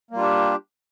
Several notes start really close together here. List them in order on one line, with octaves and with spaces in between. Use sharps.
A#3 G3 F4 D4 G4